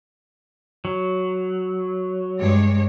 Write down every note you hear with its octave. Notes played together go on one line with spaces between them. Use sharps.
F#3
G2 G#3 C#5